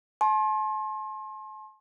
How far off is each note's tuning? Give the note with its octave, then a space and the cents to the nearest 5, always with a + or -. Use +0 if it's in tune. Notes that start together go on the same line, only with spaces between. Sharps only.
A5 -40 C6 +35